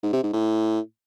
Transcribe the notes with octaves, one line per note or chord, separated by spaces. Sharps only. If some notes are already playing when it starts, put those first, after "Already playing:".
G#2
C3
G#2
A2